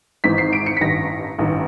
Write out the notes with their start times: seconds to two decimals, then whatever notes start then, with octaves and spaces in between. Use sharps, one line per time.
0.24 G#1 G#2 E3 B6
0.38 C7
0.53 D7
0.66 C#7
0.77 B6
0.81 A1 G2 D#3 A#6
1.38 A1 G2 D#3